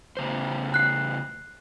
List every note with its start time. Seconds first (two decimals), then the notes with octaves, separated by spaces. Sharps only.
0.17 A2 C#3 C5
0.74 F#6 C7